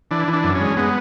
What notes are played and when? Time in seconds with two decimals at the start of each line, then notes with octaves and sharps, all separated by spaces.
0.11 E3 D4
0.28 E3
0.33 D4
0.44 F#2
0.55 C#4
0.61 G#3
0.77 G#3 B3